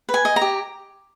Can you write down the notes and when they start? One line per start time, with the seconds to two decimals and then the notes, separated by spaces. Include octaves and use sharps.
0.09 B4
0.14 G#5
0.25 D#5
0.36 A#5
0.41 G4